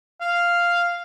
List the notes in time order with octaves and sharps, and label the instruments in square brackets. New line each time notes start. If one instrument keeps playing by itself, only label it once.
[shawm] F5